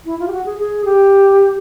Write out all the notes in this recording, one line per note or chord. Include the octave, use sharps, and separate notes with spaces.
E4
F4
G4
F#4
G#4
G#4
G4